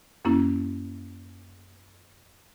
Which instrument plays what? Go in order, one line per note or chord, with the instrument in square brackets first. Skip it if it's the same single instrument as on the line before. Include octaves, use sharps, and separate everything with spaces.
[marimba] F#2 A#3 C#4 E4